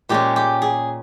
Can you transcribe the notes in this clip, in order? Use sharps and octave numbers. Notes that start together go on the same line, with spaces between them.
A#2 G#3 C#4 G4
G4
G#4